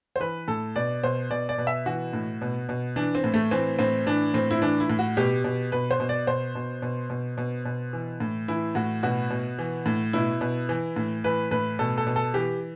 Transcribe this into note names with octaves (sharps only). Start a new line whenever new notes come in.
C5
E3 B4
A2 A4
B2 D5
B2 C5
B2 D5
D5
B2
E5
E3 F#4
A2
B2
B2
E3 D4
C4
A2
A3
E3 C4
A2 C4
E3 D4
A2 C4
E4
E3 D4
E4
A2
F#4
B2 G4
B2
B2 B4
C5
B2
D5
B2 C5
B2
B2
B2
B2
B2
E3
A2
E3 E4
A2 F#4
B2 F#4
B2
E3
A2
B2 E4
B2
E3
A2
E3 B4
A2 B4
B2 A4
A4
B2
A4
E3 G4